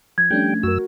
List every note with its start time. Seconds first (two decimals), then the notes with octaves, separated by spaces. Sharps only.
0.18 F3 G#6
0.31 G3 A3 C#4 D4 G5
0.63 F#2 F#4 A#4 E6